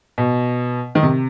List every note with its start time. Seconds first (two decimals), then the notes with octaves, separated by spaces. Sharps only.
0.18 B2
0.95 D#3
1.03 C3